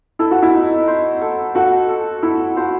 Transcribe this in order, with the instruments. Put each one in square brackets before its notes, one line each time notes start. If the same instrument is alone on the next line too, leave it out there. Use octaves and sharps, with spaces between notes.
[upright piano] E4 [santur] A4
[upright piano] F#4
E4
[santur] D#4
C5
A4
[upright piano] F#4 [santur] A4
[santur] A4
[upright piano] E4 [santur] A4
[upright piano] F#4 [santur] C5